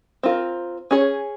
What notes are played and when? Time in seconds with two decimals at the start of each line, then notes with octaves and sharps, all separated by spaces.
0.23 C4 F4 A#4
0.91 C#4 G#4 C#5